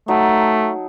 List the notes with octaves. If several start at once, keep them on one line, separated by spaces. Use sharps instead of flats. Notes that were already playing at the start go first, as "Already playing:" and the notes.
F#3 A3 D#4 A5